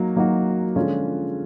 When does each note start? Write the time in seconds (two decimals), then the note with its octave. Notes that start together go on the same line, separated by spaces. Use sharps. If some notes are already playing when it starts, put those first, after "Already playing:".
Already playing: F#3 A#3 D#4 F#4
0.16 F#3 A#3 D#4 F#4
0.76 D3 F3 G#3 C#4 F4